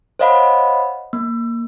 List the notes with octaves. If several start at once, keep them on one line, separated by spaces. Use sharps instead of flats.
C5 C#5 D#5 F5 F#5 B5
A#3